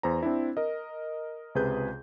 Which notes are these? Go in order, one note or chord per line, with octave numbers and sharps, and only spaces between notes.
E2 C5 A#5
C4 D4 E4
A#4 D#5
C#2 C3 G#4 B4 G6